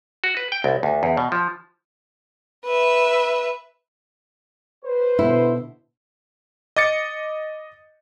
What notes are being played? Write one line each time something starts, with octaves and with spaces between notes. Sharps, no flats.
F#4
B4
G5
C2
D2
E2
B2
F3
B4 E5
B4 C5
B2 D3 E4
D#5 D6 A6 C#7